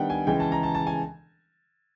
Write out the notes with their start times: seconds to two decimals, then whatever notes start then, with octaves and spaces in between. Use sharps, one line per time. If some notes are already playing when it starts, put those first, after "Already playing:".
Already playing: D#3 G3 B3 D4 F#5 G5
0.10 G#5
0.27 C#3 E3 G#3 G5
0.40 A5
0.52 A#5
0.63 A5
0.75 A5
0.87 G#5